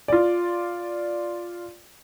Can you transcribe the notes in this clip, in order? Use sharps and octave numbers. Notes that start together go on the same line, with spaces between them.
F4 D5